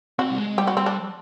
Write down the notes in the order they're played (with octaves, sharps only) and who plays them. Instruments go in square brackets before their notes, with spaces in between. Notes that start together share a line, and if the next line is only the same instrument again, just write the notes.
[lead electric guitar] C4 [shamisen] F#4
[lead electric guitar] G3
G#3
[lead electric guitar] G3 [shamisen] G4
[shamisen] F#4
[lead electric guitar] G3 [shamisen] C4
[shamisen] D4